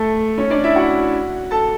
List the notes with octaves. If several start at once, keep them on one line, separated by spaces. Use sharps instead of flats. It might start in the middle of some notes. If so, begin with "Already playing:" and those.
Already playing: A3 A4
C#4 C#5
D4 D5
E4 E5
F#4 F#5
A4 A5